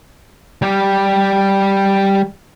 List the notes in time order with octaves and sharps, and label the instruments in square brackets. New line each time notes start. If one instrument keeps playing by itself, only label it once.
[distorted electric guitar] G3 G4